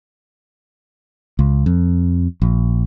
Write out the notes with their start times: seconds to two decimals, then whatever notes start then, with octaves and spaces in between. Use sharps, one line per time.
1.39 C#2
1.66 F2
2.42 A#1